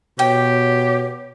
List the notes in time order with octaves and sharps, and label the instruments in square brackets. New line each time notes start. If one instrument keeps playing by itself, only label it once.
[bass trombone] B2 [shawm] G4 [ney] C#5 [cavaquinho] G5